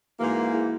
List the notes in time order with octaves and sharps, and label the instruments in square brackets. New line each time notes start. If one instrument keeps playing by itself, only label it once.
[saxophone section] G#2 E3 A#3 [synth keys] F#4 A#4
[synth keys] E4 G#4